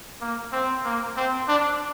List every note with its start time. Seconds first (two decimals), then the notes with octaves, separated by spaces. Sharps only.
0.21 A#3
0.52 C4
0.84 A#3
1.16 C4
1.48 D4